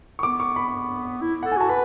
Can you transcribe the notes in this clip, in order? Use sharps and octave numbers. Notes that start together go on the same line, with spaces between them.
C#6
B3 D6
C#6
B5
E4
A4 F#5
G#5
F#4 A5
B4 B5